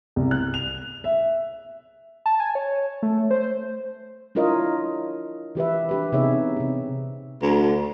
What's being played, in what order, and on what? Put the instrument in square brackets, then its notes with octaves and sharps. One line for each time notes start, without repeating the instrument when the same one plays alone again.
[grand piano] C2
F#6
F7
E5
[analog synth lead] A5
G#5
C#5
A3
C5
[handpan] D4 E4 F4 A#4 C#5 D#5
E3 G4 B4 E5
D4 G4 B4
C3 B3 D#4 G#4 C#5 E5
C3 C4
[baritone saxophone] D2